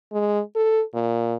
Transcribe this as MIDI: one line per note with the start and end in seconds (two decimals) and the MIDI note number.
0.12 0.41 56
0.56 0.83 69
0.94 1.35 46